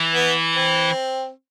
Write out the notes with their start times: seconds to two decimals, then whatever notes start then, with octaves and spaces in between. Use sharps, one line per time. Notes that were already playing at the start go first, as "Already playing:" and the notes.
Already playing: E3
0.15 B3
0.55 C4